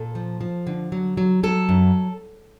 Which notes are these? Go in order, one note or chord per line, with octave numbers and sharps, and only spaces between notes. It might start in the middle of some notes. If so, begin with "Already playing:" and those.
Already playing: A#2 A4
F3
F3
D3
F#3
F#3
F#3 A4
F#2